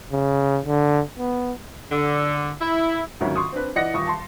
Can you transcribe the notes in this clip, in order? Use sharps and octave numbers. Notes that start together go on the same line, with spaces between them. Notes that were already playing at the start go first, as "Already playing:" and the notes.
C#3
D3
B3
D3
E4
D2 G#2 D#3 F#3 C#4
C6 C#6 D#6
C4 D4 B4
E3 D5 D#5 F#5 A#6 C#7
D#1 C#6 D#6
A5 C6